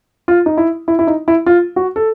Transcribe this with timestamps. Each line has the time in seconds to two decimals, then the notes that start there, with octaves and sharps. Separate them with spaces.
0.28 F4
0.46 D#4
0.57 E4
0.88 E4
0.99 E4
1.07 D#4
1.28 E4
1.46 F4
1.76 F#4
1.96 A4